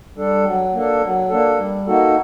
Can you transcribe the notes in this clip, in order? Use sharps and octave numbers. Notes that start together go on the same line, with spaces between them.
G3 D4 A4
F#3
A#3 D4 A4
F#3
A#3 D4 A4
G3
A#3 D#4 F#4 A4